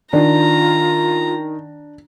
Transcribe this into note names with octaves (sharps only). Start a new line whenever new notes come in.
D#3 D4 F4 A#5